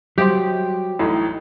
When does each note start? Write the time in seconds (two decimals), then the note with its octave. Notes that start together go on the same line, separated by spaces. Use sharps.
0.18 F#3 G3 G4 C5 C6
0.99 A1 A2 D#4